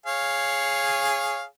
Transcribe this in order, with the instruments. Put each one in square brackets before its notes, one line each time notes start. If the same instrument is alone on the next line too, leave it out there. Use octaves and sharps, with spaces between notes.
[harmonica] G#4 C#5 F5